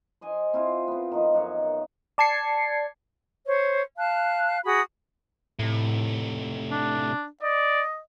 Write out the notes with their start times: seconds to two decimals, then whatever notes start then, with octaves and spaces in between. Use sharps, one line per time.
0.21 C5 D#5 G#5
0.53 C4 E4 F4
0.88 B3 C4
1.12 D#3 F3 B3
1.33 F#2 D#4 C#5
2.18 D5 A5 G#6 C7 C#7
3.46 C5 C#5
3.97 F5 A5 F#6
4.64 F#4 G#4 B5 D#6
5.59 A2 C3 A3
6.71 D4
7.43 D5 D#5